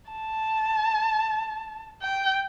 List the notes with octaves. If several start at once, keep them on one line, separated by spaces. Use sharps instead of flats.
A5
G5